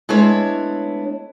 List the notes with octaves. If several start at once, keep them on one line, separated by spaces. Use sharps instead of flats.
G#3 A3 B3 D4 E4 C#5